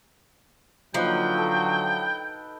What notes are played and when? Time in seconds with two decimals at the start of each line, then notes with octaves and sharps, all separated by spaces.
0.94 D3 F3 F#3 A#3 D#4 B4 G5
1.37 A4